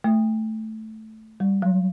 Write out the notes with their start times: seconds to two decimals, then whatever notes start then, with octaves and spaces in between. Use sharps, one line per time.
0.04 A3
1.40 G3
1.62 F#3